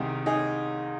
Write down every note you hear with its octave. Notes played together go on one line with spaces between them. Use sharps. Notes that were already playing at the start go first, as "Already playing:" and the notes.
Already playing: C2 C3 D#3 D#4 G#4
D#4 G#4